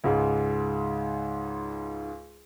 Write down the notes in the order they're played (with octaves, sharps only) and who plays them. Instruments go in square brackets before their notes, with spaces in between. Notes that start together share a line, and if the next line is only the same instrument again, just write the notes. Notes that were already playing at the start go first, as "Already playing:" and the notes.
[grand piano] C#2 G#2